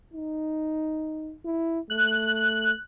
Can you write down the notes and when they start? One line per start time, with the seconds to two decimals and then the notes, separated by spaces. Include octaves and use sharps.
0.14 D#4
1.44 E4
1.90 A3 F#6